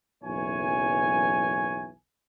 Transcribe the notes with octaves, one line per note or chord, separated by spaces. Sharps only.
F#1 B1 E3 C#5 G#5